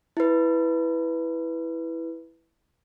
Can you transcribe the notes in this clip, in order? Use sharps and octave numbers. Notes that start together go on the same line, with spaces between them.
E4 B4